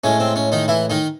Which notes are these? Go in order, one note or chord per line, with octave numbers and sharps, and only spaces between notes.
A2 G#3 C#4
C4
C#4
D#3 D#4
E3 E4
D#3 D#4